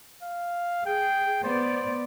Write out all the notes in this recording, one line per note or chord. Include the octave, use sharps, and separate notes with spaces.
F5
G#4 G5
B3 C5 D5